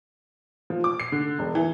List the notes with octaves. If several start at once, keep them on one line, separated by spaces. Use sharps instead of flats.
F3
D6
C7
D3
E1
E3